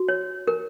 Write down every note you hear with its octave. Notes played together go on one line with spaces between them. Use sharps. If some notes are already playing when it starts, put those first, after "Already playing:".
Already playing: F#4
C#5
A#4